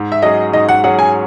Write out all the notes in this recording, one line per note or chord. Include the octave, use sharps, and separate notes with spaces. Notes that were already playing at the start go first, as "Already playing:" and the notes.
Already playing: G#2
E5
F#3 C#4 G#4 D#5
G#2 D#5
F#5
F#3 C#4 G#4 F#5
G#5